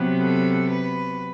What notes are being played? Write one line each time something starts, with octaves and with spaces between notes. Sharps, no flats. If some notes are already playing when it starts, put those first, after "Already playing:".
Already playing: C3 F#3 B3
A4
B4